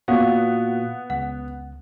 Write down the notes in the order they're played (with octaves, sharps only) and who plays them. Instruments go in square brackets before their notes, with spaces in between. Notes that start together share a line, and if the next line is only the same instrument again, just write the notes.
[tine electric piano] A#2 F#4 [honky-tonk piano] B3 [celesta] F5
[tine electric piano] C#2 [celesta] F#5